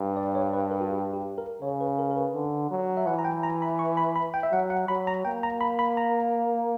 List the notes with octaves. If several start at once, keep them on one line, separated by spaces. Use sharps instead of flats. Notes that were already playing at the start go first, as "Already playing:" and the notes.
Already playing: G2
D5
C#5
B4
A#4
F#4
G4
G4
A#4
C#3 C#5
B4
A#4
A#4
B4
D3
F#3
E5
E3 F#5
A#5
G5
A#5
B5
C#6
B5
B5
G5
E5
F#3 F#5
F#5
F#3 B5
A#5
A#3 G5
A#5
B5
B5
A#5